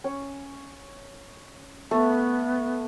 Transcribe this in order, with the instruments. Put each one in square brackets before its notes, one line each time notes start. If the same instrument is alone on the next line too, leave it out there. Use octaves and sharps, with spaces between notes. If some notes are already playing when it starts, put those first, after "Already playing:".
[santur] C#4
[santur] A3 [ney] B3